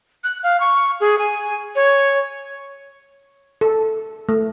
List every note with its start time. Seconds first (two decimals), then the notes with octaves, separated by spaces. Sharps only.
0.24 F#6
0.43 F5
0.60 C#6
1.00 G#4
1.19 G#5
1.75 C#5
3.61 A4
4.29 A3